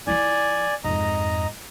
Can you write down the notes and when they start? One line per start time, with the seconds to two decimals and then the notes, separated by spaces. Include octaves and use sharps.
0.07 F3 E4 D5 G#5
0.84 F2 G#2 D#5 A#5